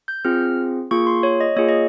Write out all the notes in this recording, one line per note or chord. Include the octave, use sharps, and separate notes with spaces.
G6
C4 F4 G#4 F6
A#3 F4 G#4 C#6
C6
C#5
D#5
A#3 F4 G#4 C#5
D#5